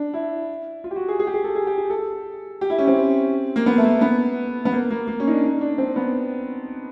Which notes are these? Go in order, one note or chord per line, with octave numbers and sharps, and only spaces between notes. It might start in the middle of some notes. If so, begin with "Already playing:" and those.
Already playing: D4
E4
F4
G4
F#4
G#4
G#4
G4
G#4
A4
G#4
G4
G#4
A4
G4
E4
C#4
C4
A#3
B3
A3
A#3
B3
B3
A#3
A#3
A#3
C#4
D#4
D4
D#4
D4
C4
B3